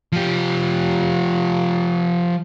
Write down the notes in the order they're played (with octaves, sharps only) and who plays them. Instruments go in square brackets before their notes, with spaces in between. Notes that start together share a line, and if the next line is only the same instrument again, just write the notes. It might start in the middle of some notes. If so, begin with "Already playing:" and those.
[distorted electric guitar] F3 G4